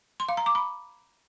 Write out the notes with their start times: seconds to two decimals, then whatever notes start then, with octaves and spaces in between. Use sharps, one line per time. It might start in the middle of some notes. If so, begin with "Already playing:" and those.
0.20 C6
0.29 F5
0.37 A#5
0.46 D6
0.55 B5